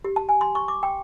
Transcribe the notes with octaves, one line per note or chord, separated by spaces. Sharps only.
G4
A5
G#5
C6
C#6
D6
G5